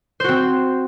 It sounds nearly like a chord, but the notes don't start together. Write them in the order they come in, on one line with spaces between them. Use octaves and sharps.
C5 F#4 C4